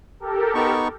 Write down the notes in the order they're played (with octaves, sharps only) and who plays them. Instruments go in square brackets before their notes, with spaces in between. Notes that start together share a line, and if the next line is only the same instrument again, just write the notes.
[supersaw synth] G4 A4 A#4
[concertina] B3 D#4 C#6